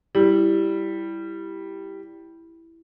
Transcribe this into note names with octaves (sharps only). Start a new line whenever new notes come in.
G3 E4